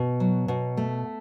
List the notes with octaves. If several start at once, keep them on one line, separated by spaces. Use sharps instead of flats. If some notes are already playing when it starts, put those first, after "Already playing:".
Already playing: B2
F#3
B2
A3